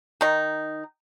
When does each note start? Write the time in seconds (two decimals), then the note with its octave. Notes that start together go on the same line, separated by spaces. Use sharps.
0.21 D#3 D#4